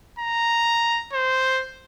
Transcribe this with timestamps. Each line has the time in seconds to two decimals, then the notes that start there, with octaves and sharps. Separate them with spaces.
0.19 A#5
1.13 C5